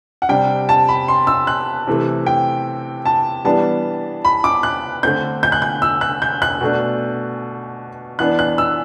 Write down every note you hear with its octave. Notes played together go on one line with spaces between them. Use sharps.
F#5
C3 G3 D4 G5
A5
B5
C6
E6
F#6
C3 E3 A3
G5
A5
E3 G3 B3 D4 A5
B5
D6
F#6
D3 A3 C4 G6
G6
F#6
G6
E6
F#6
G6
F#6
B2 A3 D4
E3 B3 D4 F#6
F#6
E6